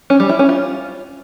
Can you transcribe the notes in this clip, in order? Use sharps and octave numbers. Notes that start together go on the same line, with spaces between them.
C#4
G3
E4
C#4
F4